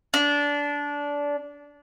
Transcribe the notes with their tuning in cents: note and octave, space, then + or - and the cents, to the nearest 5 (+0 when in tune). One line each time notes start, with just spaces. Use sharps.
D4 -20